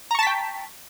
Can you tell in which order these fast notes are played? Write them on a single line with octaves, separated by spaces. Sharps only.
A#5 C#6 A5 B6 G5